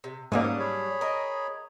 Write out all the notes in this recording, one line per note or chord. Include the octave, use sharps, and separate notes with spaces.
C3
G#2 F#3 G3 A#3 C#4 D4 D#6
G#4 C#5 B5
A#4 D#5